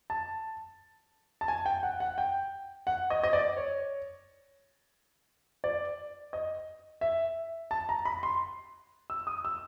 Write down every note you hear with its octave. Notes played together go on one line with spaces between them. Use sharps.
A5
A5
G#5
G5
F#5
F#5
G5
F#5
D#5
D#5
D5
C#5
D5
D#5
E5
A5
A#5
B5
C6
E6
D#6
E6